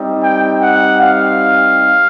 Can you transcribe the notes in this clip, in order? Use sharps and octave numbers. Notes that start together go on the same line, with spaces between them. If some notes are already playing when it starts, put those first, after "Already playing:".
Already playing: G3 C4 D#4
G5
F#5
F5